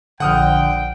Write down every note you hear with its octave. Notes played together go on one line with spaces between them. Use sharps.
A#1 D3 F#5 G5 D#6 F6